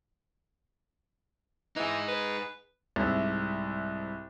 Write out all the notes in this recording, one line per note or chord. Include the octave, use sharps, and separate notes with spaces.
E3 D#4 G#4
B4
C2 G#2 E5